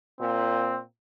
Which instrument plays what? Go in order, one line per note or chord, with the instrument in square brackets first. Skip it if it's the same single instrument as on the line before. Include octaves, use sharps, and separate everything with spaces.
[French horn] A#2 [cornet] C4